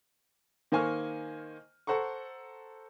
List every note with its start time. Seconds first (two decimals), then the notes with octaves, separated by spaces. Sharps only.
0.72 D#3 A#3 C5 G#5 C#6 F6
1.87 A4 C5 F#5 A#5 C#6